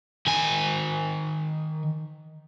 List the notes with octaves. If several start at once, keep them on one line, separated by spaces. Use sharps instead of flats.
D#3 G#5